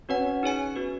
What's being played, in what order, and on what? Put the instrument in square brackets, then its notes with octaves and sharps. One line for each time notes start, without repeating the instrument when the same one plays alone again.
[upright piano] C#4 [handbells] F#4 B4 F#5
[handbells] D#4 G#4 C#5 G#5
B3 F#4 B4